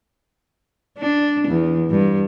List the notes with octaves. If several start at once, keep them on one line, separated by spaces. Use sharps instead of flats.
D4
E2
G2